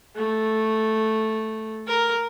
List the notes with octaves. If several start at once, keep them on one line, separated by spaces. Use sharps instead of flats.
A3
A#4